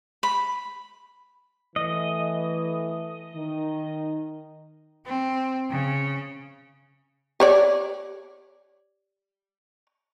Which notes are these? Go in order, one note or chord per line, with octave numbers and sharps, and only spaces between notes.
B5
E3 A3 D#5
D#3 D#4
C4
C#3
G4 C#5 D5